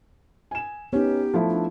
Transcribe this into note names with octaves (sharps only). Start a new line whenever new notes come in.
G#5 E7
B3 C#4 D#4 G4
F3 A3 E4
D4